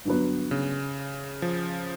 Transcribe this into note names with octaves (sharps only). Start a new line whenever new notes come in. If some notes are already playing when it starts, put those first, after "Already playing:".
G2 D3 F#3 B3
C#3
F3